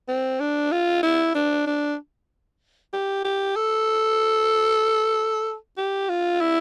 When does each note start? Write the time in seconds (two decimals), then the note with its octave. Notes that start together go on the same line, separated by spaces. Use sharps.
0.08 C4
0.40 D4
0.72 F4
1.03 E4
1.35 D4
1.67 D4
2.93 G4
3.24 G4
3.56 A4
5.77 G4
6.09 F4
6.41 E4